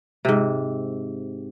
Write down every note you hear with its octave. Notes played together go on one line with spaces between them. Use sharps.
G#2 C3